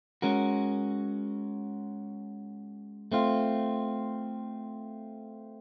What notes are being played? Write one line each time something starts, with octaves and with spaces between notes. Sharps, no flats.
G#3 C#4 F#4 A#4
A3 C4 F4